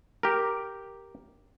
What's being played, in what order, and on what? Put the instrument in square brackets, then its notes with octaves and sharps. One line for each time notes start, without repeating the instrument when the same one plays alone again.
[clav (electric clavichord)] G4 A#4